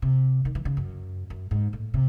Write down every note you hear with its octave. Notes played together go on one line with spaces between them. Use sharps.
C3
D#3
E3
C#3
F#2
F#2
G#2
A2
C3